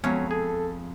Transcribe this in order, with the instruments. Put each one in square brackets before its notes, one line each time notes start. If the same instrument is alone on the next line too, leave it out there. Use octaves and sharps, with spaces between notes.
[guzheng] F2 [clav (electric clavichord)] F#3 C#4 [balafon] G#3 B3
[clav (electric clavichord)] G#4 [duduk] A4